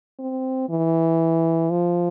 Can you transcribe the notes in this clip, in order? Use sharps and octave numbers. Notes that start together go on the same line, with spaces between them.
C4
E3
F3